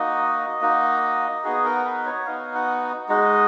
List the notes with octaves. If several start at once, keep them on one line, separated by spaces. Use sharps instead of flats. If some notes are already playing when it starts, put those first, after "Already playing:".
Already playing: A#3 D#4 F#4 D#5
A#3 D#4 F#4
B3 D#4 F#4 G#4
A#4
B4
C#5
B3 D#4 F#4 F5
F#5
G#3 D#4 F#4 D#5